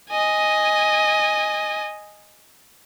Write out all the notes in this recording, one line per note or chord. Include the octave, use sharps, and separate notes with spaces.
D#5 G#5